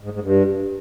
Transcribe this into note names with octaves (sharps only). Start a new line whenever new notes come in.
G#2
G#2
G2